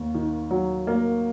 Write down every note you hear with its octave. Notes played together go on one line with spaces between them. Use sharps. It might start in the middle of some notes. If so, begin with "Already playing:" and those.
Already playing: D#2 A#3
D#3
F#3
A#3